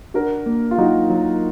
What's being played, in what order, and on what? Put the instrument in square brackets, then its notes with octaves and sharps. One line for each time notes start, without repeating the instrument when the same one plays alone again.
[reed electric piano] D4 [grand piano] F#4 A#4
[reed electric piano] A#3
[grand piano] F4
[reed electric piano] F#3 [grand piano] D#4 F#4
[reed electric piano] F#3